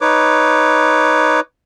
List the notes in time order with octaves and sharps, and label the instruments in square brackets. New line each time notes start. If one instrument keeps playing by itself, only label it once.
[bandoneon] D#4 B4 C#5 D6